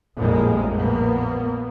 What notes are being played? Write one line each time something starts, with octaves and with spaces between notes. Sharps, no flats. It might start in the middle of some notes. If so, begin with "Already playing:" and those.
A#1 F2 A2 G3 G#3 A#3
F2 A#2 A#3 B3